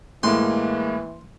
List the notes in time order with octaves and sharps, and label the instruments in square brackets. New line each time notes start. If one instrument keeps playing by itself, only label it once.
[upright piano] A2 [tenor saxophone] E3 [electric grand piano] G#3 A#3 [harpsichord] C6